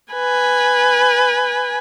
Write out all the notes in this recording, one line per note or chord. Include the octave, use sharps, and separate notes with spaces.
B4 G#5